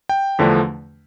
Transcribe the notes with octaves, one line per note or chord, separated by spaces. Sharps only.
G5
E2 D3 F3 A3 D4